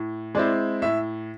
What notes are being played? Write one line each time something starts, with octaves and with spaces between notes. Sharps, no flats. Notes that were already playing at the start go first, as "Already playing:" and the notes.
Already playing: A2
G#3 C4 E4 D5
A2 E5